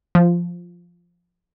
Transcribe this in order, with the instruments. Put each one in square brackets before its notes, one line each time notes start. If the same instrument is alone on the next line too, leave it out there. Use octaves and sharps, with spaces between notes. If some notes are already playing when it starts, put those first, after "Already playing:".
[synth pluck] F3